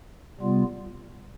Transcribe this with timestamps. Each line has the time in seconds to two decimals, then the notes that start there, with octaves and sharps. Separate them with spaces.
0.40 C3 G3 B3 F4